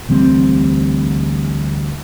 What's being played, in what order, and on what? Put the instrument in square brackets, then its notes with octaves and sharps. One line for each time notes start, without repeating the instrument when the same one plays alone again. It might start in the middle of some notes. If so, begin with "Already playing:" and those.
[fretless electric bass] D2 E3 G3 C4